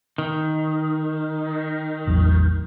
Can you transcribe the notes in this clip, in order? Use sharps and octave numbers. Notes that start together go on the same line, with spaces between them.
D#3
A1 E2 F#3